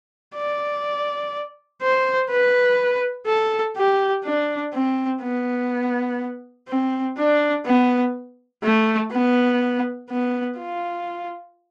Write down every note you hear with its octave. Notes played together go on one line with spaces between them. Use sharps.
D5
C5
B4
A4
G4
D4
C4
B3
C4
D4
B3
A3
B3
B3
F4